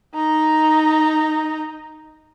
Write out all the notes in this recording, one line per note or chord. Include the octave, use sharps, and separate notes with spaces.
D#4 A#5